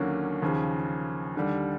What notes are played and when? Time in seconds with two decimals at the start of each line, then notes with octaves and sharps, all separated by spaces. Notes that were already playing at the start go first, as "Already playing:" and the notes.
Already playing: D#2 D3 F#3 A#3 C#4
0.42 D#2 C#3 F3
1.36 D#2 D3 G3